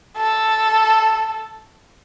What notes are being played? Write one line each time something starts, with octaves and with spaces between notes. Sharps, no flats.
A4